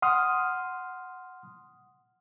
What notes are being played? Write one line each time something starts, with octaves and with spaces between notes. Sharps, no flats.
F#5 C6 D#6 F6